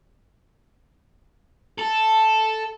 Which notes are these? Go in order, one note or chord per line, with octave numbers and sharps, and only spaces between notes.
A4